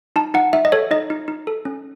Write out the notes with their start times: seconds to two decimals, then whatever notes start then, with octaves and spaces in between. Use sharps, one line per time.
0.16 D#4 A5
0.34 D#4 F#5
0.53 D#4 E5
0.65 D#5
0.72 A4 C#5
0.91 D#4 D#5
1.10 D#4
1.28 D#4
1.47 A4
1.65 C#4